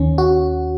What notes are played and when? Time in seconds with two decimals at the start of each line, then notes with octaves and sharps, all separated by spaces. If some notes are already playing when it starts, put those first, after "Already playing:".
Already playing: D#2 D#3 C#4
0.18 F#4